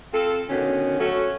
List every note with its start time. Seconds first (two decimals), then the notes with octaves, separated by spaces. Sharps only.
0.13 C4 F4 A4
0.49 B2 D3 D#3 C#4
0.99 F#3 A3 C#4 F#4 A4